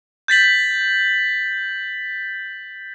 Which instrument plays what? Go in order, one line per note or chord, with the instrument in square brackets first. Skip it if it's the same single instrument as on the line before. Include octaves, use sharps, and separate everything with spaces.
[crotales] G6 A6 B6 F#7